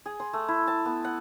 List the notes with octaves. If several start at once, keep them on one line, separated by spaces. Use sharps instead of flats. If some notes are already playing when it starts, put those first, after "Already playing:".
G#4
C6
A3
E4
A5
B3
F#5